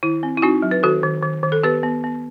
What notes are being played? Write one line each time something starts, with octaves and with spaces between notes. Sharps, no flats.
D#3 E4
C4
E4
C4 D#4 F#4
F#3
B4
D#3 F#4 A4
D#3
D#3
D#3
A4
B3 G4 B4
B3
B3